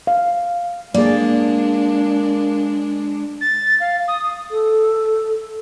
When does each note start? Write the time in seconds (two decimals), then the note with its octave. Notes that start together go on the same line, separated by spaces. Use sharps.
0.07 F5
0.94 G#3 A#3 D4 G#4 D5
3.41 A6
3.80 F5
4.08 D#6
4.51 A4